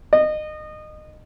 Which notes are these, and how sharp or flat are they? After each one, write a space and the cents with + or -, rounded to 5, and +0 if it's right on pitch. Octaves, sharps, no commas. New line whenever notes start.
D#5 -25